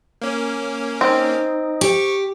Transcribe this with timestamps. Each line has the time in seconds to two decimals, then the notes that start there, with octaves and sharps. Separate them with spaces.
0.22 A#3 C#4
1.01 C4 D#4
1.81 G4 C#6